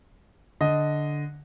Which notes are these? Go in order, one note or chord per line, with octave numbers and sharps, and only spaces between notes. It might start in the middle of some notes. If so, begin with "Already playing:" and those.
D3 D#5